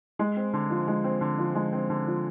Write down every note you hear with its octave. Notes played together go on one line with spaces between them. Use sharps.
G#3
C4
D3
F3
G#3
C4
D3
F3
G#3
C4
D3
F3